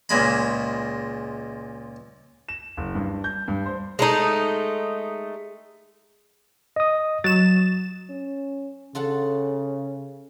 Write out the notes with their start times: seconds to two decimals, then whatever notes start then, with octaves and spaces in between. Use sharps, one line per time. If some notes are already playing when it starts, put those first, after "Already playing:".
0.09 C#2 A#2 G#3 B5
2.48 E7
2.77 F#1
2.95 G2
3.24 G6
3.48 G2
3.66 C5
3.99 G#3 A3 D#4
6.76 D#5 D#6
7.24 F#3 A6 E7
8.10 C#4
8.95 C#3 F4 A4 F#5